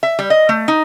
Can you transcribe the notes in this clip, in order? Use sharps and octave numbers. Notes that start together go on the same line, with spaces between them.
E5
G3
D#5
A3
D#4